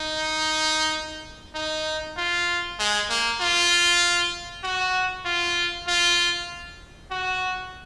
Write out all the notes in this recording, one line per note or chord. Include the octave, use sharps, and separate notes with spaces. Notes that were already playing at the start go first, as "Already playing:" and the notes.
Already playing: D#4
D#4
F4
G#3
A#3
F4
F#4
F4
F4
F#4